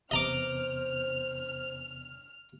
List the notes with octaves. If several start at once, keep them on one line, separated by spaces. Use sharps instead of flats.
E2 C3 B3 C5 D#5 A#5 D6 F6